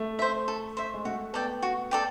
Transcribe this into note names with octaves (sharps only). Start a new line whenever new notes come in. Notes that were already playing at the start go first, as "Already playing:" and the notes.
Already playing: A3
C5 E5
A4
C5 E5
G#3
A3 F#4
B3 A4 D5 G5
F#4
A4 D5 G5